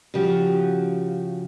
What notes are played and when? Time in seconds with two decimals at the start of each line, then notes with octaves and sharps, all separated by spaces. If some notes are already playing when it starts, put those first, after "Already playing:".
0.14 C#3 F3 F#4 G4